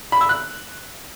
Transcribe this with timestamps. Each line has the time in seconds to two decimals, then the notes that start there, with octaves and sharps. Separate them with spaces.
0.12 B5
0.21 E6
0.29 F#6